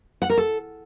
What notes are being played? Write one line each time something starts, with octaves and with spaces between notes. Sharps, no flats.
F#5
A#4
A4